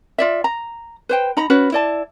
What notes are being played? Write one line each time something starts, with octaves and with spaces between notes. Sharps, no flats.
F4 D5 E5
A#5
B4 C5 G5
D#4 A#5 B5
C#4 F#4 B4 B5
E4 D5 A5